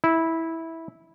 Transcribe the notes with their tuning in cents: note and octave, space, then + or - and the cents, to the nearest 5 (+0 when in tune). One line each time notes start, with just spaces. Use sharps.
E4 -15